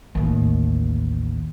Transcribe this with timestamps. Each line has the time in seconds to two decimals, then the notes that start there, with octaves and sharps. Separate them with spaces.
0.15 A1 D#2